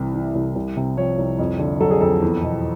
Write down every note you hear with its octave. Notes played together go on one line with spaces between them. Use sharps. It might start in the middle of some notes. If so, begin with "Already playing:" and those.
Already playing: C2 C3 E3
E3
C2
C2
C3
F3 C#5
C2
F2
D3
F#3 A4
G#4
F2 A4
E2
B2